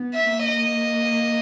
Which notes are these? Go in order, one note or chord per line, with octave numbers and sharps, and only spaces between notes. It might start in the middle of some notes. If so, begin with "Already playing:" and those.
Already playing: B3
E5
A#3
D#5